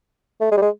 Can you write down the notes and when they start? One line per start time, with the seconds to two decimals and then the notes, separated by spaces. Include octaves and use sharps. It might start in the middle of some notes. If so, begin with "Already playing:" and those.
0.40 A3
0.51 G#3
0.57 G3
0.62 G#3